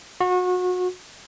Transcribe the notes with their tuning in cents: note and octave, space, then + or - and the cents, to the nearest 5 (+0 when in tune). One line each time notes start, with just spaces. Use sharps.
F#4 -30